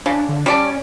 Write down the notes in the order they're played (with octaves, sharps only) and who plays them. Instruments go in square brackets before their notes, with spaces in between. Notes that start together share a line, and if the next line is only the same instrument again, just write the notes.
[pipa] C#3 [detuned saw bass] D4
[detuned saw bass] D3
[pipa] G3 D5 A5 [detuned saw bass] C#4